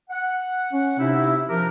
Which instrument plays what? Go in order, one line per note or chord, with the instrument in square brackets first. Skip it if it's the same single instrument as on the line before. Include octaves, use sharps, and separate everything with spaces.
[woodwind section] F#5
[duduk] C#4
[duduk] C3 [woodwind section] D#4 E4
[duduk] F3 [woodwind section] D4 G4 A#4